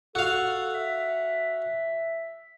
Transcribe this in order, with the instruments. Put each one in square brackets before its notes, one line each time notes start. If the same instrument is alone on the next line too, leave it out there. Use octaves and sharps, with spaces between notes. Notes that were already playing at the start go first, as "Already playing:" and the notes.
[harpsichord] F#4 F5 [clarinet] A4
[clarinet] E5